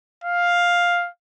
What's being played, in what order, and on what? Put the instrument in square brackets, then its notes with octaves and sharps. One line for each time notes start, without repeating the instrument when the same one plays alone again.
[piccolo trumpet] F5